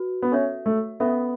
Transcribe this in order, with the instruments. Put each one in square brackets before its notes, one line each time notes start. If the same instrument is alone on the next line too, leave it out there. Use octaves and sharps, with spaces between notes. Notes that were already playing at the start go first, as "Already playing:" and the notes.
Already playing: [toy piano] F#4 B4
[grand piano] B3
[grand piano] C#4 [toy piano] A4 C#5 E5 C#6
[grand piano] A3
[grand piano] B3 [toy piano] C#4 A4 E5 C#6